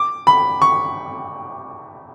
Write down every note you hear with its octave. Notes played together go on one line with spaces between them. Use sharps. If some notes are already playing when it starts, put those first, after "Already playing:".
Already playing: D6
B5
C#6